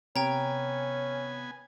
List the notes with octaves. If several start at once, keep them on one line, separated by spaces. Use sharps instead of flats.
C3 B3 C#4 G5 G#5 A#5